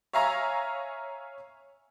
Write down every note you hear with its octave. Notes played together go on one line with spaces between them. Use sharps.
C#5 E5 F5 G#5 A#5 C#6